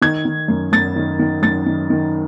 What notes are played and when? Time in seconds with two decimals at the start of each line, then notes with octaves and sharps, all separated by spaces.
0.02 D#3 G#6
0.25 D#3
0.48 F#2
0.72 F#2 A6
0.96 D#3
1.19 D#3
1.42 F#2 A6
1.66 D#3
1.90 D#3